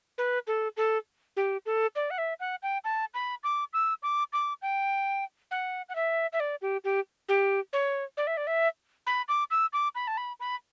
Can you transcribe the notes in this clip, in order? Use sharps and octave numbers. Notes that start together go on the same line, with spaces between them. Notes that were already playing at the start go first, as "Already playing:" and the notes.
B4
A4
A4
G4
A4
D5
F#5
E5
F#5
G5
A5
B5
D6
E6
D6
D6
G5
F#5
F#5
E5
E5
D5
G4
G4
G4
C#5
D5
E5
D5
E5
B5
D6
E6
D6
B5
A5
B5
B5